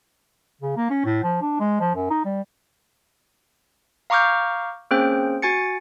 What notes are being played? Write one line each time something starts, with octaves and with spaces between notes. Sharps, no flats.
C#3
A#3
C#4
A2
F3
D4
G#3
F3
F#2
D#4
G3
F5 A#5 C#6 D6 F6 G6
A#3 C4 C#4 G#4 C5 G5
F#4 G#5 A6 C#7